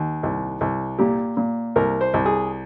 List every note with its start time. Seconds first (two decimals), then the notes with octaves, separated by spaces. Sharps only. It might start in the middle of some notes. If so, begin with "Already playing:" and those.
Already playing: D#2
0.23 C2
0.61 C2
0.99 A#2 G4
1.37 A#2
1.76 C2 A#4
2.01 C5
2.14 C2
2.26 G#4